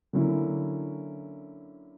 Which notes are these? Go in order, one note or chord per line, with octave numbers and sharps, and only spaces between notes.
D3 F#3 A#3 C#4 E4